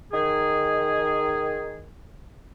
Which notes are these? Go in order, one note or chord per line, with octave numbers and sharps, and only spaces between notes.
D#3 G#4